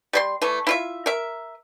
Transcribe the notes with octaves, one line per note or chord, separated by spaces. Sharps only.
G3 C5 C6
E3 A3
E4 F4 E5
A#4 E5